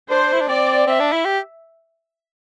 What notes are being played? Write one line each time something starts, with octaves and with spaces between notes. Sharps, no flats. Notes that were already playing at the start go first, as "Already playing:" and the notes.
D4 C5
E4
D4
C4 D5
C4 E5
D4
E4
G4